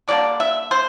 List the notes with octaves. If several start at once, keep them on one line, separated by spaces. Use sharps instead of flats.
D3 G3 A#3 D4 D5
E5
C5